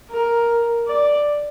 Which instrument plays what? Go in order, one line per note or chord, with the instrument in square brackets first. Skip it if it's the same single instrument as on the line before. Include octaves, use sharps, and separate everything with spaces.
[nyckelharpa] A#4
D5